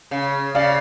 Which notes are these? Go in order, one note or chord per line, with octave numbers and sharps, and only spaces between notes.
C#3
C#3 D5 F5